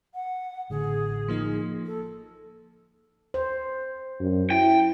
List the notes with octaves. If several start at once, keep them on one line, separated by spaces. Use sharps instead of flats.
F#5
A1 D3 G#4
F3 A#3 D#4
A4
C5
F#2
E4 G5